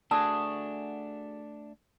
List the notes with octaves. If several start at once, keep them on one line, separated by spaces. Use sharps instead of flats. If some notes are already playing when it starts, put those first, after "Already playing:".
A3 D4 F#4 G#4 A5 E6